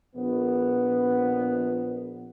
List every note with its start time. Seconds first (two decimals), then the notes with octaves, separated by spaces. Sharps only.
0.16 A#1 B3